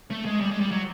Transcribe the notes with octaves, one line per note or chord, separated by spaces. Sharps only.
A3
G#3
G3
G#3
G3
F#3